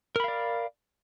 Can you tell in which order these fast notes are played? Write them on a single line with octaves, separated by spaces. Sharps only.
A#4 B5 F5 D5